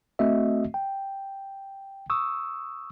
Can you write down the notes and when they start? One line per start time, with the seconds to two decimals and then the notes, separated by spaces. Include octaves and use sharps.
0.19 A3 C4 F#4 D#5 E5
0.74 G5
2.10 C#6 D#6 E6